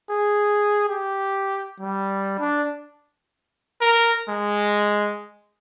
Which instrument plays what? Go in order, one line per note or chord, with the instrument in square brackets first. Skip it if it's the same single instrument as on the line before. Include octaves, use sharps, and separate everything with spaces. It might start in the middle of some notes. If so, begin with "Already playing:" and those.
[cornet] G#4
G4
G3
D4
[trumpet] A#4
G#3